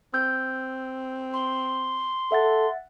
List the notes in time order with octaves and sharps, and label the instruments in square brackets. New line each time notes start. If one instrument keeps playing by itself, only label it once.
[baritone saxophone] C4 [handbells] E6 G6
[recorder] C6
[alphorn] A4 [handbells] E5 F#5 A6